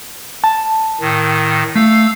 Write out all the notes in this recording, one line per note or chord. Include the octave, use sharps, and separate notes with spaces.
A5
A2 D#3
A3 F5 E6